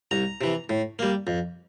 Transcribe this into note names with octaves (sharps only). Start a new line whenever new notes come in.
C2 A#5
C3 E3
A2
G3 A#3
F2